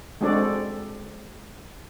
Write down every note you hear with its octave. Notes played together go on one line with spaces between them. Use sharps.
G#3 C4 D4 F#4 A4 D5